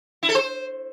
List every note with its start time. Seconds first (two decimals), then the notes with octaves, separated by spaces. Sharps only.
0.23 E4
0.29 A4
0.35 C5